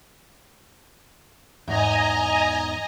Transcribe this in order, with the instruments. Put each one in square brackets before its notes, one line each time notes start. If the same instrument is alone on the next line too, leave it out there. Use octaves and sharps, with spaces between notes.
[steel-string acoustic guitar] E2 G#2 D#4 [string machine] D#5 G#5 A#5